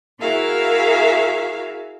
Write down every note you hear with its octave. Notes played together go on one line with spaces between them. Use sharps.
E4 F#4 G#4 A#4 E5 F5